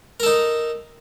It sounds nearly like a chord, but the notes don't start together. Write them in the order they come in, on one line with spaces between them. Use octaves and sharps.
A#4 A4 D#4